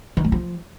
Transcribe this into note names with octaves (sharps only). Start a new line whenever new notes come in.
D#3
G#3
F3